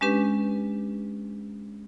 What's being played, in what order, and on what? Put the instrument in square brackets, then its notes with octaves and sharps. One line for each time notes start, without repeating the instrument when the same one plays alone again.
[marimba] G#3 C#4 D4 G4 B4